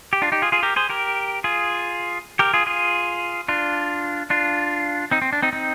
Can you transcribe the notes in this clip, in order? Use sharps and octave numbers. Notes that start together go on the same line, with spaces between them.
G4
D4 F4
D#4 G4
F4 G#4
F4 G#4
G4 A#4
G#4 C5
G4 A#4
F4 G#4
G4 A#4
F4 G#4
F4 G#4
D4 F4
D4 F4
C4 D#4
C4
D4
C4 D#4
C4 D#4